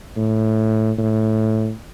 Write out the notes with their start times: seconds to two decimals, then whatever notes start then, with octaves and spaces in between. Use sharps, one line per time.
0.17 A2
0.98 A2